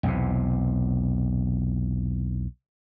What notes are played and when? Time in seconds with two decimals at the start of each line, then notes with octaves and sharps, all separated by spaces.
0.03 B1 E2 C3